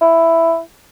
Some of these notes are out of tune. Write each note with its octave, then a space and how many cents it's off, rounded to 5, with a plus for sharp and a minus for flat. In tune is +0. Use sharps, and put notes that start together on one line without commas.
E4 +5